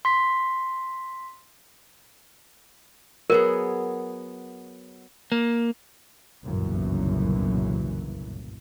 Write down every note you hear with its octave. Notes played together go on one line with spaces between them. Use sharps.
C6 B6
F#3 B3 G#4 A#4
A#3
G1 C2 F#2 A#2 C#3 E3